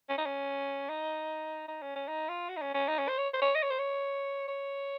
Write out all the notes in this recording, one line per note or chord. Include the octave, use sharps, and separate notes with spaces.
C#4
D#4
C#4
D#4
D#4
C#4
C#4
D#4
F4
F#4
D#4
C#4
C#4
D#4
C#4
C5
C#5
C5
C#5
D#5
C#5
C5
C#5
C#5